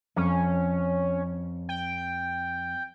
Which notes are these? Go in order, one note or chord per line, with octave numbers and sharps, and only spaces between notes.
F2 C#4
G5